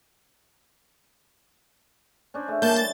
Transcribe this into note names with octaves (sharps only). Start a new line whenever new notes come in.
C#4 D4 C5
C#3 A3
E3 G3 A#3 A5 G6
A6